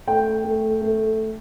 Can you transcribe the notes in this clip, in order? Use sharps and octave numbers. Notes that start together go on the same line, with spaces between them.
A3 G5
A3
A3